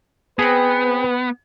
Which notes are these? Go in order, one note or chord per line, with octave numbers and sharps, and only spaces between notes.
B3 C4 G#4 B4 B5